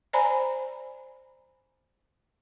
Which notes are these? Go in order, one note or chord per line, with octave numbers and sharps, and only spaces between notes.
C5 D5 G#5 A#5 B5